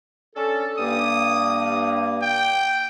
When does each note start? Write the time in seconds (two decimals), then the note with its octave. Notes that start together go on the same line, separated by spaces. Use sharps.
0.35 C#4 D4 A4
0.78 G2 A#3 D#6
2.22 G5